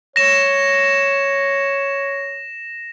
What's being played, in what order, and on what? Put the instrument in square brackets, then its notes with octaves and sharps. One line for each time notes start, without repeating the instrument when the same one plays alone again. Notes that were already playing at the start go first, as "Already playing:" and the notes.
[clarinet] C#5 [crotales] A#6 E7